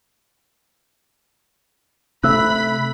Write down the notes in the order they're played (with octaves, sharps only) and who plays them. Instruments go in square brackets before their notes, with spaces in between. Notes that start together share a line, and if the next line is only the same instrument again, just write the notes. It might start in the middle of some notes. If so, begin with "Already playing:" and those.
[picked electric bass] C3 A3 [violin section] B5 [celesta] E6 F#6